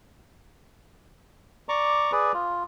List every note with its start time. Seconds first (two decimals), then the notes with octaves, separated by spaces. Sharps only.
1.69 D5 A#5 C#6 D6
2.12 G#4 B4 D5
2.34 F4